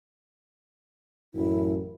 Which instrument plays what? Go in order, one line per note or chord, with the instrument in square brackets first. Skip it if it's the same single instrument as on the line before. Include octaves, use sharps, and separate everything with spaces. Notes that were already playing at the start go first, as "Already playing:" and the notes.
[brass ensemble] A1 F#2 [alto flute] E4